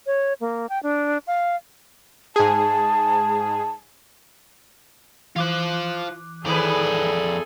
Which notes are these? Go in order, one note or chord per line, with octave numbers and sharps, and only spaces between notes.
C#5
A#3
G5
D4
F5
G#2 G#4 A5
E3 F4 C5 D6 F#6
F2 A2 D#3 G#4 A4 B4 D5